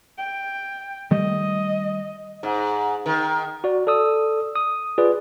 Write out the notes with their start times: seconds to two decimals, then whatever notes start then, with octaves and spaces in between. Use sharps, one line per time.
0.18 G5
1.11 D#3 G3 A3 D#5
2.43 G#2
3.06 D#3
3.64 F#4 D5
3.87 A4 D5 D#6 E6
4.56 D#6
4.98 F4 G#4 B4 D5